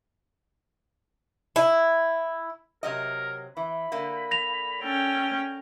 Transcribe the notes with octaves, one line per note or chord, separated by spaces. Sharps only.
E4
C3 F#3 A#4 D#5
E3 B5
D3 A#3
A#6 F7
C#4 A4 G5